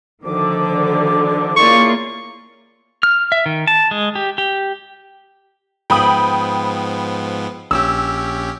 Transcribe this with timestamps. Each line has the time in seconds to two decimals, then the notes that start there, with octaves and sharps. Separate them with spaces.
0.25 D2 D3 D#3 F3 D6
1.57 A#3 C#4 E4 F4 G#4 D5 C#6
3.03 F6
3.32 E5
3.46 D#3
3.67 A5
3.91 G#3
4.15 G4
4.38 G4
5.90 G#2 F3 B3 G5 B5 D#6
7.71 A#1 C#4 G4 E6